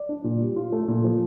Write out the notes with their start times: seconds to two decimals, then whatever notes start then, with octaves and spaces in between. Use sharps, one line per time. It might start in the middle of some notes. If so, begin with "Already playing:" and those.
Already playing: D5
0.09 D4
0.24 A#2
0.41 G3
0.56 F4
0.72 A3
0.88 A#2
1.04 F3